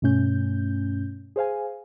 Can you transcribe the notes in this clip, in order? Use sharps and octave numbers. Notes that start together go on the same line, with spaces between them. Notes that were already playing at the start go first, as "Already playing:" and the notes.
G2 B2 A3 C#4 G6
G#4 C5 F5 G#5